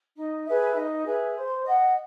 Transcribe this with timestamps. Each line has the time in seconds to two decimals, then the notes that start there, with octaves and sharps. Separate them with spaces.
0.17 D#4
0.47 G#4 B4 E5
0.76 D#4
1.05 G#4 B4 E5
1.34 C5
1.64 D#5 F#5